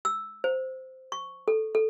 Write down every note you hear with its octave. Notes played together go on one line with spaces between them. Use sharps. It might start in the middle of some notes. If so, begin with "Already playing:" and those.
E6
C5
C#6
A4
A4